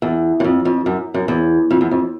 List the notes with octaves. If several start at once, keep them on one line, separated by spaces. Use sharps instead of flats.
E2
F#2
F2
F2
F#2
F#2
E2
F2
E2
F2